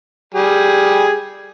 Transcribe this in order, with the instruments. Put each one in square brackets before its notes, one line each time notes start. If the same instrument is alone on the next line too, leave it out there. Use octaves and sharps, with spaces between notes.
[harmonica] G3 G#4